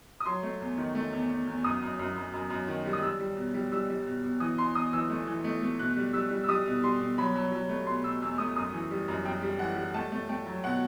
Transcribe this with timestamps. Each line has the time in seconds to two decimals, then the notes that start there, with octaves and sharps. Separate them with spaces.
0.20 D#6
0.26 F#3 C6
0.43 A3
0.60 E2
0.78 D#3
0.95 A3
1.13 E2
1.30 E2
1.47 E2
1.64 F#2 D#6
1.82 F#2
1.99 F#2
2.16 F#2
2.33 F#2
2.50 F#2
2.68 D#3
2.86 G3
2.93 D#6
3.02 G3 E6
3.20 G3
3.37 B2
3.54 G3
3.72 G3 E6
3.90 G3
4.06 B2
4.24 B2
4.40 E3 D#6
4.58 E2 C6
4.75 E2 D#6
4.93 E3 E6
5.10 A3
5.27 E3
5.44 A3
5.62 A3
5.79 B2 F#6
5.96 G3
6.13 G3 E6
6.31 G3
6.43 E6
6.48 G3 D#6
6.66 B2
6.83 G3 C6
7.00 B2
7.18 F#3 B5
7.35 F#3
7.52 F#3
7.69 A3
7.86 B2 C6
8.03 B2 E6
8.22 E2 E6
8.38 A3 D#6
8.55 F#2 D#6
8.73 E3
8.91 G3
9.08 F#2
9.25 F#2 G5
9.42 G3
9.59 E3 F#5
9.76 G3
9.94 A3 A5
10.12 A3
10.29 A3 G5
10.46 F#3
10.64 B2 F#5